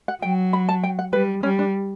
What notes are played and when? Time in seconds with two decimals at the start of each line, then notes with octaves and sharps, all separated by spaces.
0.08 F#5
0.22 F#3 G5
0.53 B5
0.69 A5
0.83 G5
0.99 F#5
1.13 G3 B4
1.43 G3 C#4
1.59 D4